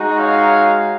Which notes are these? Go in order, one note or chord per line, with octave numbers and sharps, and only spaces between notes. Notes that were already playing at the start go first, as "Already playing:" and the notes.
Already playing: G#3 D#4 F#4
C#5 F5